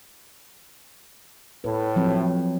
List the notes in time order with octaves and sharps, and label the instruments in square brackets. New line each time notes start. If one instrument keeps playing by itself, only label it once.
[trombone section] A2 [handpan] B4
[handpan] F3 F#3 C4